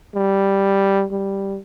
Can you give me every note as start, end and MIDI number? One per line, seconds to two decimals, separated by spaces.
0.15 1.04 55
1.12 1.59 55